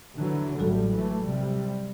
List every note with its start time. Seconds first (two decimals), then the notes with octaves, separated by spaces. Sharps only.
0.17 D3 E3 F#3
0.59 A1 A2 F#3 G3 F#4 A4
0.93 E3 A3
1.25 C3 G3